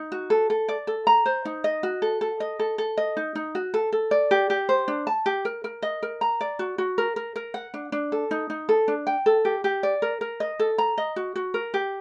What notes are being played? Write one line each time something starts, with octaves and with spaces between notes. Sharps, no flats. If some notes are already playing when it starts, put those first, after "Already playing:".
Already playing: D#4
F#4
A4
A4
D5
A4
A#5
C5
D#4
D#5
F#4
A4
A4
D#5
A4
A4
D#5
D#4
D#4
F#4
A4
A4
D5
G4
G4
C5
D4
A5
G4
A#4
A#4
D#5
A#4
A#5
D5
F#4
F#4
A#4
A#4
A#4
F#5
D4
D4
A4
D#4
D#4
A4
D4
G5
A4
G4
G4
D5
A#4
A#4
D#5
A4
A#5
D#5
F#4
F#4
A#4
G4